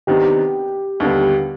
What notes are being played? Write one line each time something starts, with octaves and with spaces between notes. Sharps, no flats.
C3 D#3 B3 D4 G4
D#2 D3 G3 B3